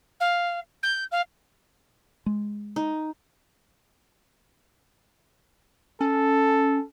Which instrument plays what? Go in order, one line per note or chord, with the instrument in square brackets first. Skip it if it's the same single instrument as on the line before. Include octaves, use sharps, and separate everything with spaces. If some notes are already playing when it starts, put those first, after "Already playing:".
[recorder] F5
G6
F5
[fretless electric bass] G#3
[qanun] D#4
[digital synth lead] C#4 [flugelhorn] A4